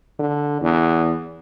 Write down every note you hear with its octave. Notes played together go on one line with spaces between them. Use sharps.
D3
E2